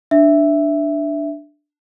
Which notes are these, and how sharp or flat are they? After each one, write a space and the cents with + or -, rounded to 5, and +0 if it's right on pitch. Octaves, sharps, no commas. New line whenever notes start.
D4 +5 E5 +0